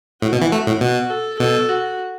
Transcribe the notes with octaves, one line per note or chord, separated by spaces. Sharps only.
A2 F#4
B2
E3
A3
A2
B2 F#4
A4
B2 A4
F#4